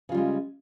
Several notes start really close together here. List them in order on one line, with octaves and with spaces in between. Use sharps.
C#3 F4 G3 G#3